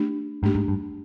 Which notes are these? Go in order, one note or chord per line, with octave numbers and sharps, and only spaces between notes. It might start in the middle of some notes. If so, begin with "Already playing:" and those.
Already playing: A3 D4 G4
G#2 A3 D4 G4
G#2
G2